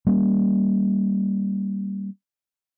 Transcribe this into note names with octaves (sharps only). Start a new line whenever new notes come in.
G3 A#3 C#4